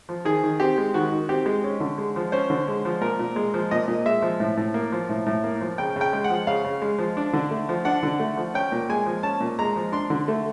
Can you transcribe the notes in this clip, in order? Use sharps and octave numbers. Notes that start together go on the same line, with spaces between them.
F3
D#3 G#4
D#3
C4 G4
G#3
D#3 F#4
D#3
C4 G4
G#3
C#4
D3
G#3
F3
C#4 C5
D3
G#3
F3
A#2 A#4
A#2
G#3
F3
A#2 D#5
A#2
G#3 E5
F3
A2
A2
A#3
F3
A2
A2
A#3
F3
C#3 G5
C#3
G5
G#3
F#5
F3
C#3 F5
C#3
G#3
F3
D4
D3
A3
F3
D4 F#5
D3
A3
F3
C#4 G5
A#2
G#3 G#5
F3
C#4 A5
A#2
G#3 A#5
F3
D4 C6
D3
A3